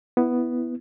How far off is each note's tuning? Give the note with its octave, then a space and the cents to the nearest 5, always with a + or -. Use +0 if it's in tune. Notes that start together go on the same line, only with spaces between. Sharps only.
B3 +0 E4 +0